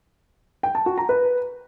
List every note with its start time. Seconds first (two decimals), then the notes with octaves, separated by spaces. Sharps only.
0.63 G5
0.75 A5
0.86 F#4
0.98 A#5
1.09 B4